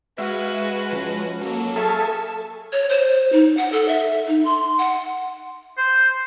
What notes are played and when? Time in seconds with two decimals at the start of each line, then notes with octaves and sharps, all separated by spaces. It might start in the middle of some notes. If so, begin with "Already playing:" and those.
0.18 G#3 F#4 B4 E5 F5
0.93 F3 C#4
1.41 F#3 A#3 A4
1.76 G#4 A4 E5 F5 A5 C#6
2.72 C#5
2.90 C5
3.32 D#4
3.57 F#5
3.72 A4
3.88 E5
4.27 D#4
4.45 C6
4.78 F#5
5.77 C5